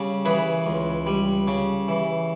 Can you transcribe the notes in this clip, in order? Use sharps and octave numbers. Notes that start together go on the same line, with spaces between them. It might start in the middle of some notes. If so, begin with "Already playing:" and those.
Already playing: C#3 G3
E3 G#4 B4
C#2
G3
C#3
E3